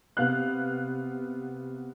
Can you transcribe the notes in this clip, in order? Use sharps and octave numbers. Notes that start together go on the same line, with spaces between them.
C3 B3 F5 F#6